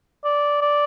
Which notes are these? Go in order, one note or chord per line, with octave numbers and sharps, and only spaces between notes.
D5
D5